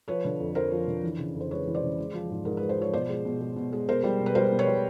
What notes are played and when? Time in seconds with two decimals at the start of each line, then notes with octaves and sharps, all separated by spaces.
0.08 F3 B4 C#5
0.25 D3
0.40 F2
0.55 F2 A#4 C5
0.71 F3
0.88 D3
1.03 E3
1.18 C#3
1.35 F2
1.41 C5
1.51 G#3 B4 C#5
1.67 E3
1.75 C5 D5
1.82 C#3
1.98 G#3
2.13 F3
2.30 G#2
2.45 G#2 A#4
2.57 G#3 B4
2.69 C5
2.78 F3 C#5
2.93 B2 C5 D5
3.09 G#3
3.25 B2
3.41 G#3
3.56 B2
3.72 G#3
3.88 B2 A#4 C5
4.04 G3
4.20 B2
4.26 B4
4.35 G3 A#4 C5
4.52 B2
4.59 B4 C#5
4.67 G3